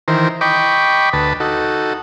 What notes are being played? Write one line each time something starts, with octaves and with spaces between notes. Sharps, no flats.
D#3 E3 A#4 C5
D#5 G5 B5 C#6 D6
D2 B4 A5
D#4 F#4 A4